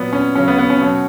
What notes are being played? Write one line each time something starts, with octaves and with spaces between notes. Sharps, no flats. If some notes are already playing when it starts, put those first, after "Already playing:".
Already playing: A#2 F#3 B3
C#4
C#3 F#3 C#4
B3
B3
C#4
B2 F#3